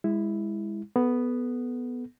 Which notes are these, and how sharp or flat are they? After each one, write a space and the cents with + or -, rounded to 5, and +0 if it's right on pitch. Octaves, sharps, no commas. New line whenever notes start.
G#3 -25 E4 +0
B3 +0 A4 -20